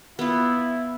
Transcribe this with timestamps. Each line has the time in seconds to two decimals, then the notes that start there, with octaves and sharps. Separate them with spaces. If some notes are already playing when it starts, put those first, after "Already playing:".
0.19 B3 E4 F4